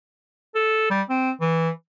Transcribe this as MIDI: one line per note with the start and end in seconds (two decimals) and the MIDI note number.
0.55 0.90 69
0.90 1.02 55
1.09 1.31 60
1.40 1.70 52